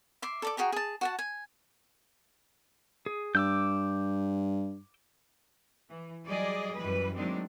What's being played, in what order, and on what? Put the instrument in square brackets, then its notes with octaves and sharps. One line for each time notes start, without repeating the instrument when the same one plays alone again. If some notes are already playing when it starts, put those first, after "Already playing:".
[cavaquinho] E5 C6 D6
A4 D5 D6
F#4 G#4 G5 A#5
G#4 A5
F#4 F#5 A5
G#5
[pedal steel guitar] G#4
[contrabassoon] G2 [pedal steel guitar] D6 E6 G6
[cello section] E3
F#3 G3 G#4 D5 D#5
F#2 E3 G3 B4
D#3 F#3 G#3 A3 C4 D4